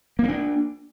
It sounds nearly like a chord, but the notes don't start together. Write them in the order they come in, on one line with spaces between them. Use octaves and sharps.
A#3 B3 D4